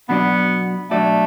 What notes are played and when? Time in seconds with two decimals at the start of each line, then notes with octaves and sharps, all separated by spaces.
0.09 B2 F#3 B3 D4 F#4 D5
0.90 B2 F#3 A3 D4 F#4 D5